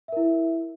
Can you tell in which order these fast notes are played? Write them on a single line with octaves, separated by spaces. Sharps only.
E5 A#4 E4